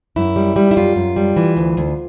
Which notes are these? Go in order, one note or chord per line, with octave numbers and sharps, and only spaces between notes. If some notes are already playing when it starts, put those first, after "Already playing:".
F#2 E4
G3
G3
E4
F#2 F4
F#2
G3
E3
D2
D2